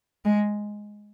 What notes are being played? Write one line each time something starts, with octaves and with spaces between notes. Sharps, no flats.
G#3